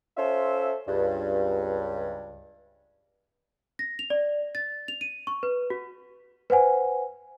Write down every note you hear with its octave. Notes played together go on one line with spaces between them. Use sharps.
C#4 F4 A4 C5 E5
C#2 G2
A#6
F7
D5
A6
F7
D#7
C#6
B4
F#4
B4 C5 F#5 G#5